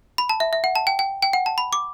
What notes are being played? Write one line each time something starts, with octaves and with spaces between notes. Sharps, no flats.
B5
A5
E5
E5
F#5
A5
G5
G5
G5
F#5
A5
B5
D6